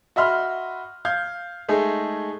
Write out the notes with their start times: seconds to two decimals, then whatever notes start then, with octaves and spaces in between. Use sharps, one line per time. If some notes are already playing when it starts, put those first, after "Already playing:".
0.16 F#4 D#5 E5 B5 C6 F6
1.05 F5 G6 G#6
1.68 G#3 A3 D#4 G#4